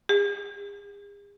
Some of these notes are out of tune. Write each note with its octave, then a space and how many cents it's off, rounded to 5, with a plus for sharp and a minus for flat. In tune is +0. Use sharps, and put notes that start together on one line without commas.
G#4 -40